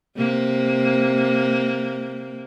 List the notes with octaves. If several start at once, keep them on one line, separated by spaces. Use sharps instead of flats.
C3 A#3